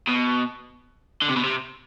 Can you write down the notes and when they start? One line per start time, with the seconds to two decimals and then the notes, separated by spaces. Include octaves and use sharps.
0.07 B2
1.22 D3
1.29 C3
1.36 B2
1.44 C3